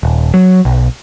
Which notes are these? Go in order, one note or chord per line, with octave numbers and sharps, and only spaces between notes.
D#1
F#3
B1